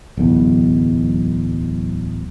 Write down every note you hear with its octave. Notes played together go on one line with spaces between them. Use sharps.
D1 B1 E2